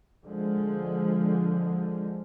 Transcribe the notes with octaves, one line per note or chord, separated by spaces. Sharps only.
D3 F3 G#3